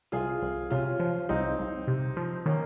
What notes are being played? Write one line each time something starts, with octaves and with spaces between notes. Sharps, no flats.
C2 F4 G#4
C2
C3 C#4 F4
F3
C2 C4 D#4
C2
C3
F3
D#3 A#3 C#4